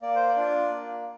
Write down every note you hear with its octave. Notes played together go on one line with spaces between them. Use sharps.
A#3 D5
C5
D5
D4 F4
A#3